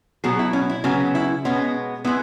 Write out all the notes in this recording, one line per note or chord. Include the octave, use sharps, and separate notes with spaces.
B2 F#3 B3 G#4
E4
C#4
E4
C#3 F#3 B3 C#4
E4
B2 G#3 B3 C#4
G#3 B3 E4